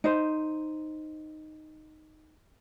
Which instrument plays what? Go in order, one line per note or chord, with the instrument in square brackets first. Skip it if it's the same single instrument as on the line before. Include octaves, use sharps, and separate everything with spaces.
[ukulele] D#4 C5